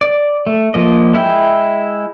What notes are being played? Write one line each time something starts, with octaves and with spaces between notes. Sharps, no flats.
D5
A3
F3 A#3 D#5
G#3 E4 E5 G5